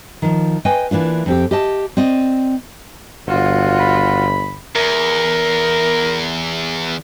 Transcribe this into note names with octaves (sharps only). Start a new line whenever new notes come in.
D#3 F3
B4 D#5 G5 G#5
E3 A#3 D4 F4
F2 C4 G4
G4 D#5 A5
C4 D5 D#5
G1 F4 F#4
B5
E2 A#4